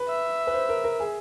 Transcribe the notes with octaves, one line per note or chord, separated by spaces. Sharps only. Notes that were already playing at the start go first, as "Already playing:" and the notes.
Already playing: B4
E5
B4
C5
A#4
A#4
G#4